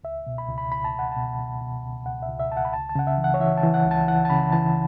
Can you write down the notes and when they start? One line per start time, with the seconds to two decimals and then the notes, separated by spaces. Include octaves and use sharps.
0.04 C#2 E5
0.27 B2
0.38 B5
0.49 C#2
0.58 B5
0.71 C#2 B5
0.84 A5
0.94 C#2 F#5
1.12 B2 A5
1.39 B2
1.61 B2
1.84 C#2
2.06 C#2 F#5
2.22 E5
2.28 C#2
2.40 E5
2.50 C#2 A5
2.57 F#5
2.65 B5
2.73 C#2 A5
2.89 A5
2.95 C#3 F#5
3.07 E5
3.18 E3
3.24 F#5
3.34 C#5
3.40 E3 E5
3.57 A5
3.63 E3
3.74 F#5
3.85 C#2
3.91 A5
4.07 E3 F#5
4.25 A5
4.30 C#3 B5
4.52 E3 A5